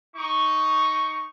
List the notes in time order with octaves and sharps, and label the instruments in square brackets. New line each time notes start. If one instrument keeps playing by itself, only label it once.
[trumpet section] D#4 C#6